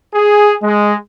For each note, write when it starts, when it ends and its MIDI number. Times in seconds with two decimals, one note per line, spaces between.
0.14 0.55 68
0.63 0.95 56